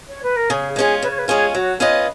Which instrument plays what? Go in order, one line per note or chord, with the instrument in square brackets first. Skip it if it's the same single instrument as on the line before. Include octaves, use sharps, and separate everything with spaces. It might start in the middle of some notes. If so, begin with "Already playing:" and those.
[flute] C#5
B4
A#4
[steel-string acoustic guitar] C#3 [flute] G#4
[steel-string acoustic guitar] G#3 C#4 F4 [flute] G#4
[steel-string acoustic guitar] C#3 [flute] B4
[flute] C#5
B4
[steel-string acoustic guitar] G#3 C#4 F4 [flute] G#4
[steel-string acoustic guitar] F#3 [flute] F#4
[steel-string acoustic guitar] C#4 F4 B4 D#5